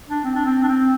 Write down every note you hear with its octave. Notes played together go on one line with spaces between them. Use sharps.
D4
C4
D4
C4
D4
C4